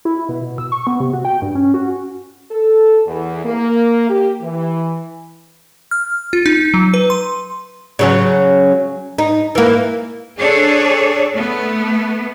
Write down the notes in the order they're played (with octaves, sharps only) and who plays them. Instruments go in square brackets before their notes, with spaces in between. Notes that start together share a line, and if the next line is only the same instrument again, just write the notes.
[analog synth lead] E4
B2
B2
E6
C#6
B3
C3
F#4
G5
G2
C#4
F#4
[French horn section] A4
E2
A#3
G4
E3
[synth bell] F6
F4
D#4
F#3
B4
C6
[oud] C#3 F#3 C#4
D#4
E3 A#3
[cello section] D4 G#4 A4 C#5 D5
A3 B3